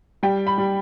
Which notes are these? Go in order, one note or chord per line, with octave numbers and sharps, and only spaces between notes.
G3 G5
B5
G3